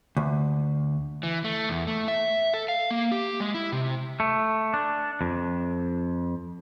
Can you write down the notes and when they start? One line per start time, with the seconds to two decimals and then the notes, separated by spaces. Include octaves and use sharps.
0.17 D2
1.23 E3
1.44 A3
1.69 E2
1.87 A3
2.08 E5
2.54 A4
2.68 F5
2.91 A#3
3.12 G4
3.40 G#3
3.54 E4
3.72 C3
4.20 A3
4.74 D4
5.21 F2